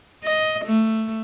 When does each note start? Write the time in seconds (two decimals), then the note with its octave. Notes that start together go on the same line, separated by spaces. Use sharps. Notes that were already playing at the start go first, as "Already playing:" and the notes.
0.24 D#5
0.65 A3